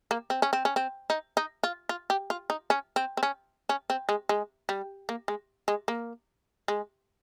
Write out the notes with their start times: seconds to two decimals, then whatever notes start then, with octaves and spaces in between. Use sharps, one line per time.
0.11 A#3
0.30 C4
0.42 C#4
0.53 C4
0.65 C#4
0.76 C4
1.10 D#4
1.37 D#4
1.63 F4
1.89 F4
2.10 G4
2.30 F4
2.50 D#4
2.70 C#4
2.96 C4
3.17 C4
3.23 C#4
3.69 C#4
3.90 C4
4.09 G#3
4.29 G#3
4.69 G3
5.09 A#3
5.28 G#3
5.68 G#3
5.88 A#3
6.68 G#3